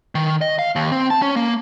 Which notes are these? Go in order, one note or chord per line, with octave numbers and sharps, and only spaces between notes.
D#3
D#5
F5
D#2
C4
A5
C#4
A#3